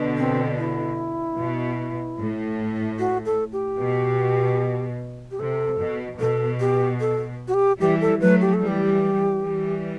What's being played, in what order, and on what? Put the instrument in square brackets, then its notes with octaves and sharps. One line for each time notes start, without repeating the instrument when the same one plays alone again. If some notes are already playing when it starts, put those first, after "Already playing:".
Already playing: [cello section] B2 D3
[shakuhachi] C4
E4
[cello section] B2
A2
[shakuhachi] F#4
A4
G4
[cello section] B2
[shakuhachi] G4
[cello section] C3 [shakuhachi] A4
[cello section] B2
[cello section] B2 [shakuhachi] A4
[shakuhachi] G4
A4
F#4
G4
[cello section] E3 G3 [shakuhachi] G4
[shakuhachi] A4
[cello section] F#3 A3 [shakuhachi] B4
[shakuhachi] G4
A4
[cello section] E3 G3
[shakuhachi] G4
[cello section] E3 G3